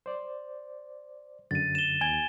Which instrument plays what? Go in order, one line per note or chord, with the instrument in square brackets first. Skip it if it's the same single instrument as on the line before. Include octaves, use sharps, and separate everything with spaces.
[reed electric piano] C5 D5
[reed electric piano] F#2 D3 [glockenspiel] A6 D#7
[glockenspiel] E7 G7
[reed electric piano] D#2 [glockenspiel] G#5 G#6 G7